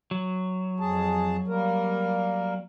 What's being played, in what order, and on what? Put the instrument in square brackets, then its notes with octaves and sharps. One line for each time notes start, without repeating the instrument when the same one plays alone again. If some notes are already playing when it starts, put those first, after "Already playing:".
[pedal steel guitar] F#3
[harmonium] F2 G#4 A5
G3 A#3 A#4